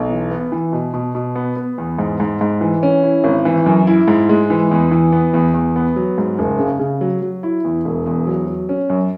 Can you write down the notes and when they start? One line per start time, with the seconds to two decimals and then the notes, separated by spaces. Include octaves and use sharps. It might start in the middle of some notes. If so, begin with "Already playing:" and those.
Already playing: B1
0.10 E3
0.31 B3
0.52 E3
0.73 B2
0.94 B2
1.15 B2
1.35 B3
1.56 B3
1.78 E2
1.98 G#2
2.20 G#2
2.41 G#2
2.61 E3
2.83 C#4
3.03 E4
3.24 G#1
3.45 E3
3.66 F#2
3.87 E4
4.08 G#2
4.29 G#3
4.50 E3
4.71 E2
4.91 E3
5.12 B3
5.33 E2
5.54 E2
5.76 B3
5.96 F#3
6.18 G#2
6.39 F#1
6.59 C#3
6.79 C#3
7.01 F#3
7.22 F#3
7.43 E4
7.64 E2
7.85 E1
8.06 E2
8.27 F#3
8.47 F#3
8.69 C#4
8.90 F#2